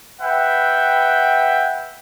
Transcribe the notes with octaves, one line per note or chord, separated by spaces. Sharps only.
B4 E5 F#5 G5